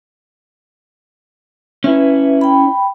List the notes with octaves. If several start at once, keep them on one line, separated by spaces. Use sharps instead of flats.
C#4 E4 B4 E5
G5 B5